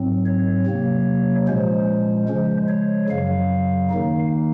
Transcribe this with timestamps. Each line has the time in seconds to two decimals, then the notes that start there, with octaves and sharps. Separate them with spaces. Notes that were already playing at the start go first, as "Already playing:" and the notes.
Already playing: G#2 F#3 C4
0.26 C#5
0.66 C3 F#3 A#3
1.48 A#2 F3 G#3 C#4 C5
2.28 C#3 F3 G#3
2.69 C#5
3.09 F#2 C#3 F#3 F5
3.90 D#3 A#3 D#4